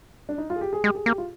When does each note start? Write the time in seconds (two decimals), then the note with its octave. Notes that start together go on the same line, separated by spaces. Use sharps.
0.29 D4
0.38 D#4
0.50 F4
0.56 G#4
0.61 G4
0.73 G#4
0.84 G#3 G4
0.95 G#4
1.06 A#3 G4
1.18 F4